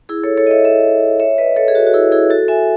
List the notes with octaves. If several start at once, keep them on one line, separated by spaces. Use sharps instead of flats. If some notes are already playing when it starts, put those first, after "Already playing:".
E4 G#4
A4 C#5
A4 C#5
D#5
C#5 E5
C#5 E5
C#5 E5
B4 D#5
A4 C#5
G#4
F#4 A4
F#4
E4 G#4
E4 G#4
F#4 A4
E5 G#5